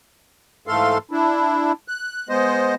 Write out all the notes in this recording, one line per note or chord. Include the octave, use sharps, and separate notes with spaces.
G#2 E3 A3 A4 F5 C6
D4 E4
F#6
G#3 B3 C5 D#5